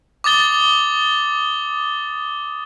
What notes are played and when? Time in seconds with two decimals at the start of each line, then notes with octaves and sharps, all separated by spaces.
0.24 D6 D#6 A6 G7